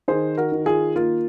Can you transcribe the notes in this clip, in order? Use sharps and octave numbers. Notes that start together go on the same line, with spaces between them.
D#3 G#4 C5
F#4 A#4
D#3
F4 G#4
A#3 F4